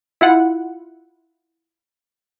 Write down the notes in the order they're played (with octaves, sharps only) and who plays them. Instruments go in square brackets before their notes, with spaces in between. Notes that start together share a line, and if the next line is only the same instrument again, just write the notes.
[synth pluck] E4 F4 F#5